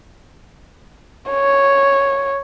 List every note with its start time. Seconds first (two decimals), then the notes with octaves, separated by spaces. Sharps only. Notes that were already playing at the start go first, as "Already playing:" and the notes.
1.31 C#5